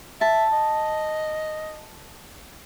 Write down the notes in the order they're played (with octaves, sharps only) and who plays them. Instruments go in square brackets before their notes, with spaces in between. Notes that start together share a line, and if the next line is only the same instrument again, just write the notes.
[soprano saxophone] E5 [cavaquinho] A5
[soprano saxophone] D#5